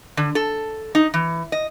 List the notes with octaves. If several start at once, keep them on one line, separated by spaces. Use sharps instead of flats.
D3
A4
D#4
E3
D#5